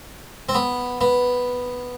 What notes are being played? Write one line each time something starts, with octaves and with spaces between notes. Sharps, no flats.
C4
B3
B3